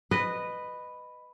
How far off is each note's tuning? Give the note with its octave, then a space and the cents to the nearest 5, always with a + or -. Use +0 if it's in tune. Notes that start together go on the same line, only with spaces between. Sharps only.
B4 +5 D#5 -15